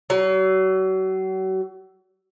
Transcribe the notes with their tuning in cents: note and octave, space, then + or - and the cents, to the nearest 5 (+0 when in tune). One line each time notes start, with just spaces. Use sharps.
F#3 +35